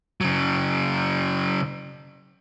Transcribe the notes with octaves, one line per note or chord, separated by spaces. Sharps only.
C#3 F#3